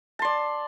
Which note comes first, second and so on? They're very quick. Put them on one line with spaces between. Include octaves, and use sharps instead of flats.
A5 C6 D5